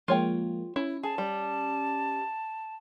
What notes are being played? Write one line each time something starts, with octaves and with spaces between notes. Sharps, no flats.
F3 G#3 A#3 F4 C#5 G5
C#4 E4
G#4 A5
G3